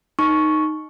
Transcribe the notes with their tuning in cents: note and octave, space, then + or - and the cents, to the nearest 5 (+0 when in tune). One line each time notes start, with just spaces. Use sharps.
D#4 -5 C#6 +0